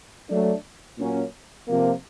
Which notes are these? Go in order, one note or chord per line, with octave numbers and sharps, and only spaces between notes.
F#3 A3 D4
A#2 F#3 A#3 C#4
C3 F3 A#3